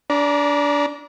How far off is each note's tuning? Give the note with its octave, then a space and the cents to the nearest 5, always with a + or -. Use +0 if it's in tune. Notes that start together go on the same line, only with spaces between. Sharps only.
D4 -25 D5 +0 A#5 +30